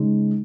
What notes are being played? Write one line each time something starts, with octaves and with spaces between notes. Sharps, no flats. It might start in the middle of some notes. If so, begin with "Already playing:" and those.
Already playing: C#3 G#3 D#4